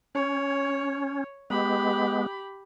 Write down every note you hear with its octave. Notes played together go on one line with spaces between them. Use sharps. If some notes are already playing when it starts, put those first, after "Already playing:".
C#4 C#5
G#3 B3 G4 B5